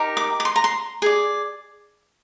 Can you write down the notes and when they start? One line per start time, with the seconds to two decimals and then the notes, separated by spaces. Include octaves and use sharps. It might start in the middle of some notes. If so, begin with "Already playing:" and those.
Already playing: D#4 G4 A#4
0.17 D6
0.40 D6
0.45 C6
0.56 A#5
0.64 C6
1.02 G#4 D5